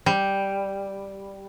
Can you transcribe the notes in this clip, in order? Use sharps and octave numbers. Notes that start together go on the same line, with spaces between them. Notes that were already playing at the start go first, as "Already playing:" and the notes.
G3